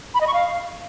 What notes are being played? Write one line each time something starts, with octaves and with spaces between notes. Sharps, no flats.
B5
D#5
C#6
F5